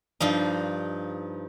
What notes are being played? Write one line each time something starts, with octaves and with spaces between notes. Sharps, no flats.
G2 F3 D#4